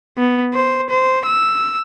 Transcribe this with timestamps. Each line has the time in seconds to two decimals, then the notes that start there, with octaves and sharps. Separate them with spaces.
0.17 B3
0.54 C5
0.90 C5
1.26 E6